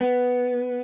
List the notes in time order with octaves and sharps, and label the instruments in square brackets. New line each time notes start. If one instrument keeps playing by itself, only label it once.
[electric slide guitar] B3